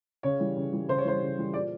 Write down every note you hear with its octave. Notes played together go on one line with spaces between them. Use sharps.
C#3 C#5
E3 G3
C#3
E3 G3
C#3 C5
C#5
E3 G3 C5
C#3
E3 G3
A#2 D5